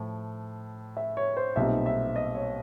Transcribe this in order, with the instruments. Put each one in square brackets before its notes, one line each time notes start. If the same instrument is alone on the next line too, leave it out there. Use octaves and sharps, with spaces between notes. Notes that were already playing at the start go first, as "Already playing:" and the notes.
Already playing: [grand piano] A2 F3
E5
C#5
C5
B1 A#2 G3 C4 D#4 E5
E5
D#5
C#5